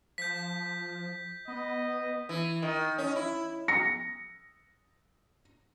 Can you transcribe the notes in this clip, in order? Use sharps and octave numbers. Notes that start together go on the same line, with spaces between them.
F3 G6 B6
B3 D#5
E3
D#3
C#4
E4
A#6 C#7